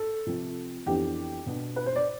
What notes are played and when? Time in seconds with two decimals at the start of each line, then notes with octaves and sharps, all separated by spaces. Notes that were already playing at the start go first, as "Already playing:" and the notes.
Already playing: A4
0.27 C3 F3 C4
0.86 F2 E3 B3 D4 G4
1.46 B2 B3 D4
1.76 B4
1.86 C5
1.96 D5